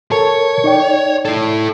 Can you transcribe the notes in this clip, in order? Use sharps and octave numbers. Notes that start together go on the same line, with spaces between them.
A4 A#4 C#5 A5
D#4 D5 G5
E4 A4